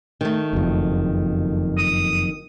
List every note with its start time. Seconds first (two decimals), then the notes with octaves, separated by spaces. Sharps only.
0.21 D#3 A3
0.53 F#1 F2
1.78 D#6